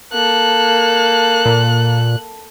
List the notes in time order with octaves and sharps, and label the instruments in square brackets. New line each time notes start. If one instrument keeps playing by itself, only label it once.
[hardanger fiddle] A#3 A4 [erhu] F#6
[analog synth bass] A#2